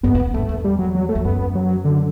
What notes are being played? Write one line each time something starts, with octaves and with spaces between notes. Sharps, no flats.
G2 B3
G2
A2
G2 A3
E2
G3
F#3
F#3
A3
E2
F#2 B3
F#3
D3